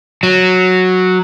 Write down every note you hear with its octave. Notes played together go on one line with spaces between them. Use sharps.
F#3